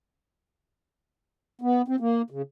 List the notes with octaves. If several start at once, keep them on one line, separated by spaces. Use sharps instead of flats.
B3
C4
A#3
C#3